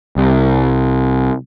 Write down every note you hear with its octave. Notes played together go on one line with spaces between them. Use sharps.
C2